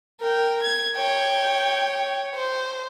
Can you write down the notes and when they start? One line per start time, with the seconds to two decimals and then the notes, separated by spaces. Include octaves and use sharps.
0.20 A#4 G5
0.62 G#6
0.97 C#5 G5
2.35 C5